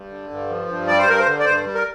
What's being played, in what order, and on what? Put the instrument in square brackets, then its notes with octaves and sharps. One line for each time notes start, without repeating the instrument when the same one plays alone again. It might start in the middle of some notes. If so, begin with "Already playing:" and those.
Already playing: [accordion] G2
D3
G2
F3
G2
G3 D5
C5
G2 A#4
C5
D3
D5
G2 C5
G3
A#4